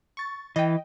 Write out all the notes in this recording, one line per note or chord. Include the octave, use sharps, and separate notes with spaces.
C#6 A6
E3 D#5 G5